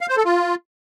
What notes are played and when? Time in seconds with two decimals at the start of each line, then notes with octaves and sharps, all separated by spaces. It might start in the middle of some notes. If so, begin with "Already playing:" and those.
0.01 F5
0.09 C5
0.17 A4
0.25 F4